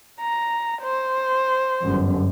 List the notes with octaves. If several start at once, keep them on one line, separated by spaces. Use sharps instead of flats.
A#5
C5
G1 F#2